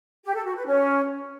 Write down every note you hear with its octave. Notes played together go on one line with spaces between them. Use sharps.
G4
A4
F#4
B4
C#4